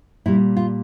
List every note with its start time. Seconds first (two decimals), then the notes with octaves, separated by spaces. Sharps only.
0.26 A#2 G3 E4
0.57 F4